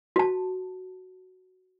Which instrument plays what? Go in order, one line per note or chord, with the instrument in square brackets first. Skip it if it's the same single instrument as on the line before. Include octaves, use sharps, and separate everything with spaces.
[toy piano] F#4 A5